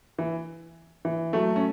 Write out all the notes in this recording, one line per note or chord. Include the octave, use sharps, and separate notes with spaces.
E3
E3
F#3 A3
C#4